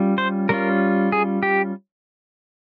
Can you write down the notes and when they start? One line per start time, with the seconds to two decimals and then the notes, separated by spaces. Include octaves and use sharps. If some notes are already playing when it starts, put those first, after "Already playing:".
Already playing: G3 C#4 F4
0.18 C5
0.49 G3 C#4 F4 A#4
1.12 G#4
1.43 G4